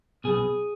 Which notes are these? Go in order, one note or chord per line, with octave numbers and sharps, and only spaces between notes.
B1 B2 G#4